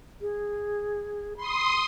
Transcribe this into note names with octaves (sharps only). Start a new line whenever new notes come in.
G#4
B5 C6 D#6